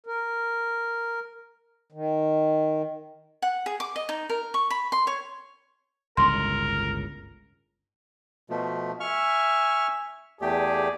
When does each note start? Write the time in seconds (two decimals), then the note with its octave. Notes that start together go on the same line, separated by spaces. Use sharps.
0.06 A#4
1.92 D#3
3.42 F#5
3.66 G#4
3.80 D6
3.96 D#5
4.09 D#4
4.30 A#4
4.54 C#6
4.70 B5
4.92 C6
5.07 C#5
6.17 G1 C#2 A2 A#4 C6
8.50 B2 F3 A3
9.00 E5 G#5 C#6 F6
10.41 E2 A3 G4 G#4 D5